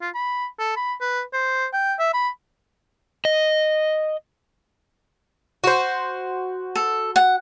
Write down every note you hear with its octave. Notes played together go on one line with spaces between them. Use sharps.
F4
B5
A4
B5
B4
C5
G5
E5
B5
D#5
F#4 C5
A4
F#5